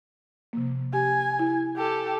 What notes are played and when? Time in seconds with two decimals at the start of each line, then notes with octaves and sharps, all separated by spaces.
0.53 C3 F3 A#3
0.93 G4 G#5
1.39 E4
1.77 G4 A4